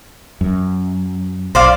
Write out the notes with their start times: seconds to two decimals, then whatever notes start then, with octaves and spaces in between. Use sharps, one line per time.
0.41 F#2
1.55 B1 C5 D5 F5